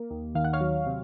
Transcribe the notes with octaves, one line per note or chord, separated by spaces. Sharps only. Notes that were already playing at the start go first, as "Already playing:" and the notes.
Already playing: A#3
D#2
D#3 F5
F#5
C#5 F5
F#3
C3